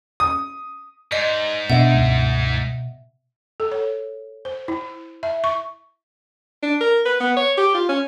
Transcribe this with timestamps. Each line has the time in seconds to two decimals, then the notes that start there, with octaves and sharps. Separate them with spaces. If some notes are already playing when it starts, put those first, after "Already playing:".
0.20 D#6
1.12 G#2 D5 D#5
1.70 B2 B3 D4 E5 F#5
1.94 C#2 G2
3.60 A4
3.72 C#5
4.45 C5
4.68 E4
5.23 E5
5.44 C#6
6.62 D4
6.80 A#4
7.05 B4
7.20 B3
7.36 C#5
7.57 G4
7.74 F4
7.89 C#4